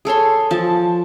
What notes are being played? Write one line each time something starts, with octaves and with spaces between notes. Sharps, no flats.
G#4 A4 C#5 C6
F3 A5